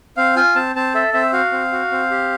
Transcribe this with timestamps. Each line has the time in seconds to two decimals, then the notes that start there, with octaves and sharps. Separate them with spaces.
0.17 C4 F5
0.36 F4 G#5
0.55 C4 A5
0.76 C4 A5
0.94 A4 E5
1.14 C4 E5
1.33 F#4 F5
1.52 C4
1.73 F#4
1.92 C4
2.11 G4